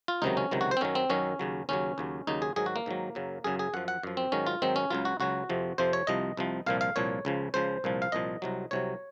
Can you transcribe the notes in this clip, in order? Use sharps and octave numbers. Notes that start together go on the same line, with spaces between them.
F4
C#2 C3 D#3 F#3 D#4
C#4
C#2 C3 D#3 F#3
F#4
C5
C4
F#2 D#3 F#3 C#4
C4
F#2 D#3 F#3 C#4
D#2 C#3 F#3
D#2 C#3 F#3 C#4
D#2 C#3 F#3
D#2 C#3 F#3 D#4
G#4
G#2 D#3 F#3 G#4
F#4
A#3
G#2 D#3 F#3
F#2 C#3 F#3
F#2 C#3 F#3 G#4
G#4
F#2 F3 F#5
F#5
F#2 F3
C4
G#2 D#3 F#3 C#4
F4
G#2 D#3 F#3 C4
C#4
C#2 C#3 F#3 F4
F#4
C#2 C#3 F#3 F#4
F2 C3 F3
F2 C3 F3 C5
C#5
C2 C3 F3 D#5
C2 C3 F3
C2 A#2 F3 F5
F5
C2 A#2 F3 C#5
C#2 C#3 F3
C#2 C#3 F3 C5
C2 A#2 F3
F5
C2 A#2 F3 D#5
C2 C3 F#3
C2 C3 F#3 C#5